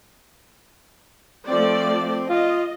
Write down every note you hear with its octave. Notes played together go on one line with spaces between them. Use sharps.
F3 A3 C4 D5
F4 D#5